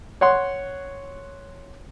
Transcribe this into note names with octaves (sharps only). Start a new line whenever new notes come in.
C#5 F#5 C6